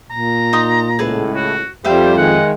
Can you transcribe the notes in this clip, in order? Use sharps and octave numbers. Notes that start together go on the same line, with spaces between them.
A#2 A#5
D#4 C6 D#6
C#2 A2 G#4 A4 B4
F#4
F2 G3 C5 E5 F5 G5
D#3 G#3 F#5